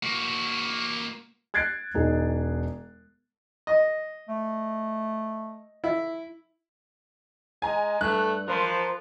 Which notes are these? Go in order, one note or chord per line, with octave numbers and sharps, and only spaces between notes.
A#3 F#4
F#6 G#6 A6 C7 D7
E1 D#4 G#4
D#5
A3
E4
G#3 G#5 A#5
G2 A3 F#6
F3 A#4 C5